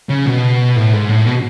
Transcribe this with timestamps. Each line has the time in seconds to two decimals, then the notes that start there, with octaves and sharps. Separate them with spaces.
0.09 C#3
0.26 B2
0.76 A2
0.93 G#2
1.08 A2
1.26 B2